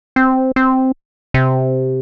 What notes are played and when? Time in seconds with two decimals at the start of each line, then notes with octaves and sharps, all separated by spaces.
0.16 C4
0.56 C4
1.34 C3